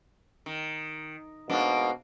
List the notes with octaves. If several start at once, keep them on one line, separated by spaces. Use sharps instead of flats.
D#3
G#2 B2 A#3 D4